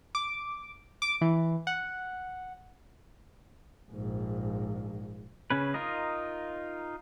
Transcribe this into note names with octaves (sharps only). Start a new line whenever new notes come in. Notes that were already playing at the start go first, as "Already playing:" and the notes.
D6
D6
E3
F#5
A#1 G#2
C#3 C#4 B4
D#4 F4 A#4 D#5